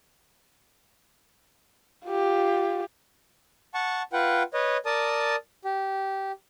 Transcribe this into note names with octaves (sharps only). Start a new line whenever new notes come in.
F4 G4
F#5 A5 C#6
F4 B4 F#5 G5
B4 C#5 D#5
A#4 D5 A5 D#6
G4